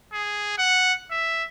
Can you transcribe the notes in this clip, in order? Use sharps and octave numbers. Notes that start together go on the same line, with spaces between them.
G#4
F#5
E5